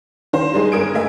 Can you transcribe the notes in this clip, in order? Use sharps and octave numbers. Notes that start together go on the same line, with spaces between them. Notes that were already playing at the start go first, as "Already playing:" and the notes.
D#3 C5
G3 G#3 D#4 G#4 B4
G1 C#4 A#4 D#6 G#6 D7
A3 A#4 B4 D#5 E5 G#5